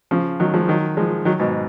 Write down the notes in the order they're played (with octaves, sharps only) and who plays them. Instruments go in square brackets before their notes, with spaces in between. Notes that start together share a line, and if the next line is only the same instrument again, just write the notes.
[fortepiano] C#3 F3
D#3 F#3
F3 G#3
D#3 F#3
F3 G#3
D#3 F#3
G#2 B2